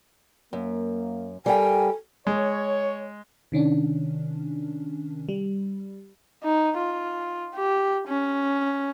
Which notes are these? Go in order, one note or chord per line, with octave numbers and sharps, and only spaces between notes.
F#2 A#3
G3 A4 A#4 G5 G#5
G#3 C#5
C3 D#3 C#4 D4
G3
D#4
F4
G4
C#4